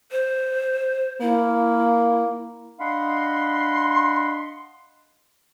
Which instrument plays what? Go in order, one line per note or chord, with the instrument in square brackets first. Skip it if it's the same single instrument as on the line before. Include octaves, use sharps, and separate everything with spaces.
[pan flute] C5
[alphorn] A#3 [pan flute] E4
[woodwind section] D4 D#5 F5 F#5 B5 C6